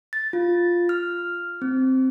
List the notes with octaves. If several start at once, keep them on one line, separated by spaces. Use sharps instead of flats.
A6
F4
F6
C4